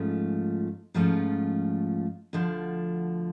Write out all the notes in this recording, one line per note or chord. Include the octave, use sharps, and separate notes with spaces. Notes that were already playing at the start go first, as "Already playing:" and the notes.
Already playing: G#2 F3 A3 C#4 F4
G#2 F3 A3 C#4 F4
D2 D3 F3